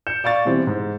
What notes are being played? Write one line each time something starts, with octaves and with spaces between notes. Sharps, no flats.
G6 C#7 E7
D5 F5 C#6 A6
B2 E3 G3 C4
G#2